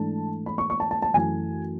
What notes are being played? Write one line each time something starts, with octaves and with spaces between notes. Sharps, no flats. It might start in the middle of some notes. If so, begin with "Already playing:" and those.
Already playing: G#2 E3 A3 D4 A5
B5
C#6
C#6
A5
A5
A5
F#2 E3 A3 G#5